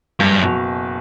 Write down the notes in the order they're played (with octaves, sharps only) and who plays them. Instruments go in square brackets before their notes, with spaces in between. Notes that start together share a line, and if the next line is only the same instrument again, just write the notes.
[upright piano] F#1 [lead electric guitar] G2
[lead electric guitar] F#2
[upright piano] B2